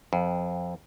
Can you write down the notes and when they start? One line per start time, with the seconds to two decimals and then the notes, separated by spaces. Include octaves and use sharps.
0.13 F2